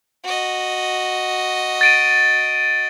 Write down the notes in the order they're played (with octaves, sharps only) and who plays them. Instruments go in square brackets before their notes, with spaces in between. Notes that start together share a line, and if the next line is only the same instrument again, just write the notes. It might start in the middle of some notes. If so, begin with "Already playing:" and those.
[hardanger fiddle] F#4 D#5
[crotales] A6 D7 D#7